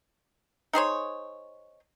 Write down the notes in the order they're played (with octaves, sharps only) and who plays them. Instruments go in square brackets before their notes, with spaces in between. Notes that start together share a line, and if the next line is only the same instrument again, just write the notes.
[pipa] D#4 G#4 C5 C#5